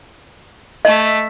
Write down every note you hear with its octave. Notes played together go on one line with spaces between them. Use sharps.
A3 D#5 E5